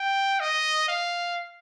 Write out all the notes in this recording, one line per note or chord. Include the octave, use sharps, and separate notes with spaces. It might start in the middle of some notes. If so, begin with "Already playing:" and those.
Already playing: G5
D#5
F5